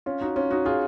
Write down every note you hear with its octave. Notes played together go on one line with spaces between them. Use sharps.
C#4 F4
D#4 F#4
C#4 F4
D#4 F#4
F4 G#4